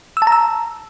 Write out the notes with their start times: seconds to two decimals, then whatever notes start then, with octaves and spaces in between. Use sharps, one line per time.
0.17 E6
0.22 A5
0.27 A#5
0.32 E6